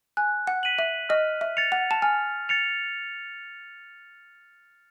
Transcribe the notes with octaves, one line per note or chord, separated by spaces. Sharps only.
G#5 F#6
F#5
B6 D#7 F#7
E5
D#5 F6
E5
A6 C#7 F7
F#5
A5
G#5 F6
A6 C#7 F7